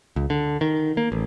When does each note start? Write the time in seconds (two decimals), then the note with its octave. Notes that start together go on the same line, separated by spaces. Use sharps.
0.16 C#2
0.30 D3
0.61 D#3
0.97 A#3
1.12 A1